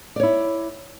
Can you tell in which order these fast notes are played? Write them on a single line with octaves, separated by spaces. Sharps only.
D5 C#5 E4